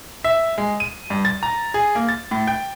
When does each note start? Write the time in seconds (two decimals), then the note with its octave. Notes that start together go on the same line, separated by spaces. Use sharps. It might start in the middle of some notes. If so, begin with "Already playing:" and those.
0.24 E5
0.58 G#3
0.80 D#7
1.10 G2
1.25 A6
1.43 A#5
1.74 G#4
1.95 A#3
2.09 A6
2.31 A2
2.47 G5